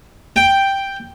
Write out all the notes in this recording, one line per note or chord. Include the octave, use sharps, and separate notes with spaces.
G5